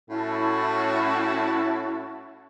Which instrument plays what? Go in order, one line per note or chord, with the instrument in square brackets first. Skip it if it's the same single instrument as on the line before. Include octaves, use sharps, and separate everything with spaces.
[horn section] A2 C#4 F#4 [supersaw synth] E4 A5